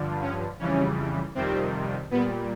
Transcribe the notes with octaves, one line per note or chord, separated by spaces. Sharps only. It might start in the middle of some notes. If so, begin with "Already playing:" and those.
Already playing: G2 D3 F3
C#4
F2 C#3 E3 G3 C#4
F2 C3 D#3 G3 C4
A#2 G3 B3